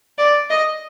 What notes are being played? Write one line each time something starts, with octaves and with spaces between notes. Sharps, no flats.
D5
D#5